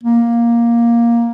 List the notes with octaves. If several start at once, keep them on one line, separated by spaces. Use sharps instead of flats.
A#3